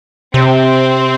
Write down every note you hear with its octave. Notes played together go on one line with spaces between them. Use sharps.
C3 C4